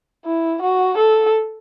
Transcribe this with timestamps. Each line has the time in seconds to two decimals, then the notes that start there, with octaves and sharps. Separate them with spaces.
0.26 E4
0.62 F#4
0.98 A4